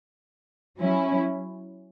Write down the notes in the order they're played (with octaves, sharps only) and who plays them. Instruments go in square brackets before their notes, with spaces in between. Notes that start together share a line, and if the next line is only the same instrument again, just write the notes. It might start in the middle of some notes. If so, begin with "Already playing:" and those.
[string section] F#3 C#4 E4